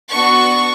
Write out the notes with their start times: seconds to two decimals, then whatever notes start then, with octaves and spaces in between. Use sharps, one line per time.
0.11 B3 D4 F#4 C#6